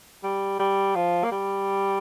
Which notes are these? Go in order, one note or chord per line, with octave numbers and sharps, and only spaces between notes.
G3
G3
F3
A#3
G3